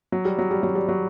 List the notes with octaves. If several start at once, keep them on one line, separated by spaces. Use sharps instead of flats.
F#3
G3
F#3
G3
F#3
G3
F#3